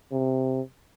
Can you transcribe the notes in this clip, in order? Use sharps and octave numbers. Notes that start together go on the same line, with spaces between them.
C3